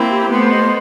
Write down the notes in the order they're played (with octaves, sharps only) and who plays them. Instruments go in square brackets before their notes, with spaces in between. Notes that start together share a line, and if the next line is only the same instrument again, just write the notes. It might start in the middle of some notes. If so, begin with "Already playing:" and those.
Already playing: [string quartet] A#3 C4 [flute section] E4
[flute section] G4
[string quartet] A3 B3 [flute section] C5
[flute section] D#5